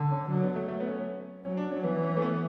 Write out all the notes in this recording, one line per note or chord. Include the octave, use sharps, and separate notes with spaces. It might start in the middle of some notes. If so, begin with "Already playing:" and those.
Already playing: D3
C#4
F#3 D4
B3
A3
A3
B3
C#4
F#3 C#4
D4
C#4
E3 B3
C#4
A3
B3